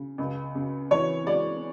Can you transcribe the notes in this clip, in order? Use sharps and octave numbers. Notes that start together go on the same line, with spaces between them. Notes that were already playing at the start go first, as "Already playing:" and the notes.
Already playing: C#3
C#2
C#3
E3 C#5
G#3 D5